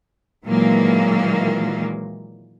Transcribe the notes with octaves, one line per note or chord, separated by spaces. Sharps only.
A#2 D#3 E3 F#3 G#3 A#3